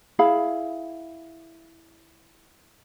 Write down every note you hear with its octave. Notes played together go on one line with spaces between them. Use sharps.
E4 G#4 F5 B5